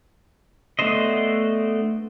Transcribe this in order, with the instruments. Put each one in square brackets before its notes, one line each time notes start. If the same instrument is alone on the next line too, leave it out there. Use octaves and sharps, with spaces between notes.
[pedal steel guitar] A3 B3 D4 C5 D#5